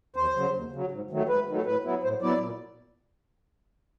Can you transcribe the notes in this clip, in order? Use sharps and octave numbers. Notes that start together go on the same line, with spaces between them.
D#2 C5
C#3 F#3
D#2
C#3 F#3
G#2
D#3 F#3 A3
G#2 B4
D#3 F#3 A3
A2 B4
F#3 B3 E4
A2 C5
F#3 B3 E4 D5
A#2